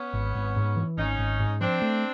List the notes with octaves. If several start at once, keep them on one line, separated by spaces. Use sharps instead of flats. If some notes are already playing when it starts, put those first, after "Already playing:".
Already playing: B3 C#4
G#1
G#1
G#2
E3
G#1 C#4 D#4
G#1
G#2
F3 C4 D4
A3